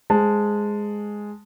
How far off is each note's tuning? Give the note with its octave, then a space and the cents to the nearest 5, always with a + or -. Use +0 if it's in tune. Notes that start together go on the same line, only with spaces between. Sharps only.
G#3 +0 C5 +0 A5 +0